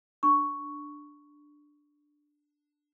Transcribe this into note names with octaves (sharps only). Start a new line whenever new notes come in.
D4 C#6